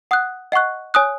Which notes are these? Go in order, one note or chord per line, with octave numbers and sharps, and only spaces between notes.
F#5 D#6 F#6
D#5 F#5 C#6 F#6
C#5 G#5 D#6 F#6